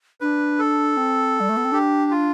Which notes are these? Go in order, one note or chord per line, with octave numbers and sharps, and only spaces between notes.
D4 B4
A4
C4
G3
A3
B3
C4
D4 G4
F4